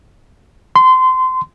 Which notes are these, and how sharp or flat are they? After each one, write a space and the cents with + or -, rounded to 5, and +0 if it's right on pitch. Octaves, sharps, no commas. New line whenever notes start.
C6 -25